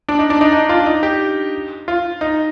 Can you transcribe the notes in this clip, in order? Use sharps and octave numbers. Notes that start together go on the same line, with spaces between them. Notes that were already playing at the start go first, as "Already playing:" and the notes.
D4
D#4
D4
D#4
D#4
F4
D#4
G4
F4
D#4